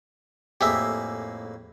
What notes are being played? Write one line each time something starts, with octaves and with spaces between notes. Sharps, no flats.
F2 A2 A#3 G4 G#4 E5